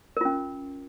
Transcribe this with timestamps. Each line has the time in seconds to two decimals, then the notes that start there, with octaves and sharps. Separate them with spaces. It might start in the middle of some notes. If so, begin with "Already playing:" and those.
0.17 A#4
0.21 F4
0.25 C#4